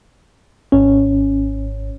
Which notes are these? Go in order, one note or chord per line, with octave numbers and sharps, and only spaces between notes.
G#1 C#4